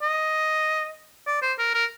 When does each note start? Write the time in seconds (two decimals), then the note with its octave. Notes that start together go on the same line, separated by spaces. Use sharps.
0.02 D#5
1.27 D5
1.42 C5
1.58 A#4
1.74 A#4